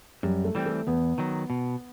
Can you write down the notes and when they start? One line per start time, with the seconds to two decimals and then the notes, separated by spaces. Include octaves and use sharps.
0.23 F#2 G3
0.45 A3
0.55 E3 G3 C4
0.66 A3
0.87 E2 B3
1.18 D#3 F#3
1.50 B2